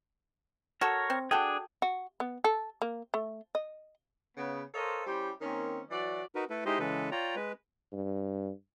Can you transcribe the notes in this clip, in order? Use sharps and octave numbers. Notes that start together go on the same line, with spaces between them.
F#4 A4 A#4 C#5
C4
D4 F#4 G#4 A4 G5
F#4
B3
A4
A#3
A3
D#5
C#3 B3
A4 A#4 C5 C#5 D#5 F5
G3 C#4 E4 G4 C5
D#3 A#3 C4 C#4
E3 F#3 F#4 D5
D#4 F#4 A#4 B4
A3 E4 A4 B4
G#3 D#4 E4 G4 C5 D#5
C#3 E3 G#3 A4 B4
F4 C#5 D5 G5 A#5
G#3 B4
G2